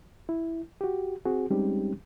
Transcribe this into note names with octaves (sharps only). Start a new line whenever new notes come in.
E4
F#4 G4
C4 F#4 G#4
G3 G#3 C4 C#4 D#4 G4